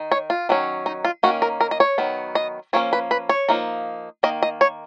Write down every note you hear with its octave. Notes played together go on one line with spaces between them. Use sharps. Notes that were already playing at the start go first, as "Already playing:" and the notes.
Already playing: D#3 D#4
C#5
F4
D#3 F#3 C#4
D#4
F4
D#3 A#3 C#4 F#4
A#4
A#4
D#5
C#5
D#3 F#3 B3
D#5
F3 A#3 C#4 C#5
B4
B4
C#5
F3 A#3 D#4
D#3 A#3 D#5
D#5
C#5